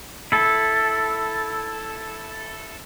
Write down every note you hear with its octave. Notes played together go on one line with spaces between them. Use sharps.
E4 A4